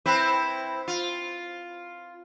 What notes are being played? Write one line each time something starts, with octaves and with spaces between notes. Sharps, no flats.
C4 E4 B4
F4